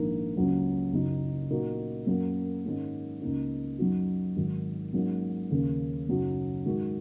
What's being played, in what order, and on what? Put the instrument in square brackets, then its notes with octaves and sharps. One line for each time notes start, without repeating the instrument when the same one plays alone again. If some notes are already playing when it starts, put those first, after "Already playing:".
Already playing: [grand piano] A#1 G#2 D#3 A#3 D#4
C#2 C#3 F#3 A#3
F#1 F#2 F#3 D#4
A#2 A#3 D#4 F#4
F#2 F#3 A#3
G#2 D#3 G#3 C#4
C#2 C#3 A#3 D#4
F#2 F#3 D#4 F#4
G#1 G#2 D#3 F#3
G#2 F#3 A#3 C#4
D#2 C#3 A#3
F#1 F#2 F#3 D#4 F#4
G#2 D#3 G#3 F#4